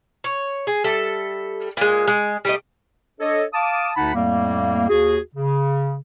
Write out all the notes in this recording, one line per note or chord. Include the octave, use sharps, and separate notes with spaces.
C#5
G#4
G3 A4 E5
A#2 G#3
G#3
G3 A3 D#5
D4 A4 C#5 D#5
F5 A5 D6 D#6
D2 D3 D#4 F#5 A5 B5
F2 A2 G3 A3 A#3
D#2 F#4 G#4
C#3